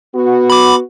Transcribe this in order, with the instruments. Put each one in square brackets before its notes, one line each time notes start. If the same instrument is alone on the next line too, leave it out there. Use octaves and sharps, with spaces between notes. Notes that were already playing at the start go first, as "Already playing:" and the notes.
[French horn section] B3 F#4
[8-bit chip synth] B5 D6